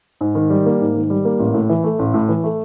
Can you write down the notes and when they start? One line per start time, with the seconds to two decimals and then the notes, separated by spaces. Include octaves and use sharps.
0.21 G#2
0.35 D#3
0.50 G3
0.66 A#3
0.81 G#2
0.95 D#3
1.10 G3
1.25 A#3
1.39 A1
1.54 A2
1.69 E3
1.84 A3
1.99 A1
2.14 A2
2.29 E3
2.44 A3